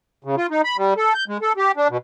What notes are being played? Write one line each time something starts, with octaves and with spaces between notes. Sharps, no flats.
C#3
F4
D#4
B5
G3
A4
G6
G#3
A4
G4
D4
B2